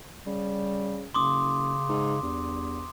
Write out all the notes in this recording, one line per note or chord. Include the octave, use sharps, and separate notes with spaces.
C#3 G3
F#1 C#3 C6 D6 D#6
G#2
E2 G2